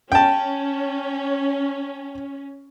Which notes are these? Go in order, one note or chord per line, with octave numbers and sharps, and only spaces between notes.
C#4 G5 A5